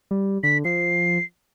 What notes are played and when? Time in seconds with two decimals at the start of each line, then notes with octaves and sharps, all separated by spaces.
0.11 G3
0.43 D3 B6
0.65 F3 C7